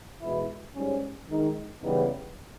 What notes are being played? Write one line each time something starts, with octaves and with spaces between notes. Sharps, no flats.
E2 B2 G#3 B3 E4
G#2 G3 C#4
D#3 G#3 D#4
C#3 E3 G3 B3 D#4